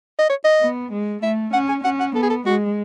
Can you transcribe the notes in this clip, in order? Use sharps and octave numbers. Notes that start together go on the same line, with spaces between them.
D#5
C#5
D#5
B3
G#3
A3 E5
C#4 F#5
G#5
C#4 F#5
F#5
B3 A4
G#4
A4
G#3 F#4